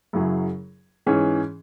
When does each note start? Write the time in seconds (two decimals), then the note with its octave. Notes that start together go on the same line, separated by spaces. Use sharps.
0.13 F#2 C#3 F#3 E4 G#4
1.06 G#2 E3 C#4 G#4